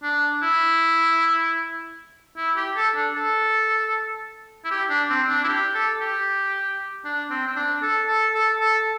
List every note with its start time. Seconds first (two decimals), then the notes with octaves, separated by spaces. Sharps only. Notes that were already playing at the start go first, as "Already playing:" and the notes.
0.03 D4
0.42 E4
2.37 E4
2.56 G4
2.77 A4
2.96 D4
3.15 A4
4.65 E4
4.71 G4
4.90 D4
5.10 C4
5.29 D4
5.44 E4
5.48 G4
5.75 A4
6.01 G4
7.05 D4
7.31 C4
7.47 C4
7.56 D4
7.83 A4
8.08 A4
8.35 A4
8.61 A4